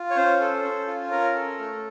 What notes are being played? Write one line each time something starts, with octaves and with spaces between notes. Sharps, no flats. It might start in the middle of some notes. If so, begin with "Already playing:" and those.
Already playing: F4
C#5
C#4 C5
A4
C#4
F4
C#4 A#4
A4
A3